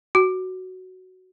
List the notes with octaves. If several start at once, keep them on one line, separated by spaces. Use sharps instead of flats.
F#4